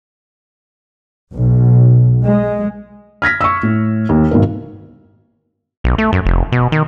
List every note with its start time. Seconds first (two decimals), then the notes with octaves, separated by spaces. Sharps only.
1.33 B1
2.26 G#3
3.22 F6 G#6 A#6 B6
3.41 C#6 E6
3.63 A2
4.09 D#2
4.31 G#1 B2 A#4
5.84 B1
5.98 A3
6.13 F#2
6.25 F1
6.52 B2
6.72 D#3